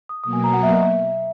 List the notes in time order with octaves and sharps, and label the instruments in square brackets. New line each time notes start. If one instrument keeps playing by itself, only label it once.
[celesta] D#6
[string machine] B2 F#3 A#3 [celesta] D#6
[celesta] G#5
A#5
F#5
E5
D#5
E5